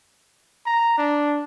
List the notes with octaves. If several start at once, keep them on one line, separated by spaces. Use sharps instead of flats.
A#5
D4